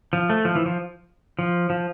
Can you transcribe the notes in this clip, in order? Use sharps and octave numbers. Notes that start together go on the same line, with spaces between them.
F3
A3
F3
E3
F3
F3
F3